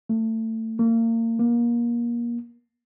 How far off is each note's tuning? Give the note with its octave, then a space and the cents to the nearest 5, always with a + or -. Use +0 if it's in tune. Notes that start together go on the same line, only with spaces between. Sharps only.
A3 +25
A#3 -35
A#3 +25